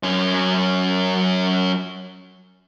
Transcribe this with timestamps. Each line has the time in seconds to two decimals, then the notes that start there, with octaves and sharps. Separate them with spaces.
0.03 F#2 C#4